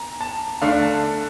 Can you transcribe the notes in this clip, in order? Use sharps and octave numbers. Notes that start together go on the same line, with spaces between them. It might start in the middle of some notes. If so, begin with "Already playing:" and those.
Already playing: A#5
A5
D3 A3 D4 F5
A5